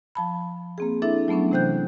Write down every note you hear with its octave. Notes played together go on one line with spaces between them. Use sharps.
F3 A5 B5
A#3 C4 G#4
D4 E4 A4 E5
F#3 A3 B3 C#4 D4
C3 E3 C5 G5 F#6 G6